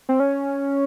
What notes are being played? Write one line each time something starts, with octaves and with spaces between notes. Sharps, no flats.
C4
C#4